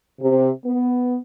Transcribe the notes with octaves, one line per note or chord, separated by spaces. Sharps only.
C3
B3